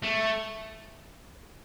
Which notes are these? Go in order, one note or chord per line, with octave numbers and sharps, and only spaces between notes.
A3